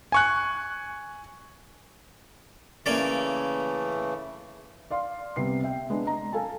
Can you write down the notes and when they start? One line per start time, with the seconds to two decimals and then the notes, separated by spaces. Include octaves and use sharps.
0.12 G#5 C#6 F#6
2.86 C#3 E3 A3 A#3 C#4 D5
4.90 D5 F5 C6
5.36 C2 C3 B3 C7
5.64 E5 G5
5.90 G#3 B3 D4
6.05 D#5 A#5
6.33 A4 F5 G#5 A5